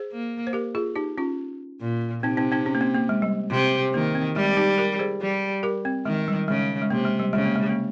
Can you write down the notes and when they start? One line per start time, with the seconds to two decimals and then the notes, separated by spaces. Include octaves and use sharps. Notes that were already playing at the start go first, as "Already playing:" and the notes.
Already playing: G#4 C5
0.12 A#3
0.47 C5
0.53 G4 A#4
0.75 F4 G#4
0.96 D#4 G4
1.18 C#4 F4
1.81 A#2
2.23 C3 C4 D#4
2.37 C4 D#4
2.52 C4 D#4
2.66 C#4
2.75 A#3
2.81 C4
2.95 A#3
3.09 G#3
3.22 G3
3.51 C3
3.94 D#3 A#3
4.15 C4
4.36 G3 G#3
4.57 D#4 G4
4.78 G4 A#4
4.99 G#4 C5
5.21 G3
5.63 G4 A#4
5.85 C4
6.05 D#3 G#3
6.28 G3
6.48 C#3 G#3
6.82 G#3
6.90 C3 A#3
7.05 G#3
7.20 G3
7.33 C#3 G#3
7.45 A#3
7.56 G#3
7.69 A#3